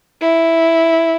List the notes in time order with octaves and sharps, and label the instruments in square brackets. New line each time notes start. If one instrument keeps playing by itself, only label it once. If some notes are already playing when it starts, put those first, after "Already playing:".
[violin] E4